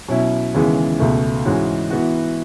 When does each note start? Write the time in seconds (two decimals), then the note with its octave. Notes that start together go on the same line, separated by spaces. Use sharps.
0.08 B2 F#3 C#4 E4
0.54 D#2 C#3 E3 G#3 B3
0.99 C#2 B2 A3
1.45 G#2 E3 G#3 C#4 F#4
1.90 E3 B3 F#4